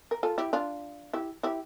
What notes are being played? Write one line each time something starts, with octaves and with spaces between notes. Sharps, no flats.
A#4
F4 A4
E4 G4
D4 F4
E4 G4
E4 G4